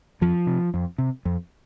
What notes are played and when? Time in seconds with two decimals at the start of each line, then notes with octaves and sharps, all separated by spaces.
0.21 F2 F3
0.47 C3
0.74 F2
0.98 C3
1.25 F2